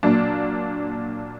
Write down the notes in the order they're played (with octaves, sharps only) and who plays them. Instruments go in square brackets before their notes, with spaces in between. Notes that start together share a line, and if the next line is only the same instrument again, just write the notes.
[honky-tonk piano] A#2 F#3 A#3 D4